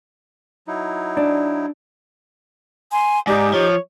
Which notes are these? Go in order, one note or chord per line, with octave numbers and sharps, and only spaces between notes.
F#3 D#4 E4
D4
G#5 C6
G#2 D#4 G4 D5
F3 C#5